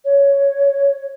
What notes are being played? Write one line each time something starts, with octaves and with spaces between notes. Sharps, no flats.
C#5